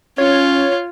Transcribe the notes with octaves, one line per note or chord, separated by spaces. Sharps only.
C#4 F4 C#5